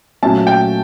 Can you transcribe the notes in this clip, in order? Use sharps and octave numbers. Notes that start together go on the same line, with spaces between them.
A#2 F#3 A3 C#4 A5
G5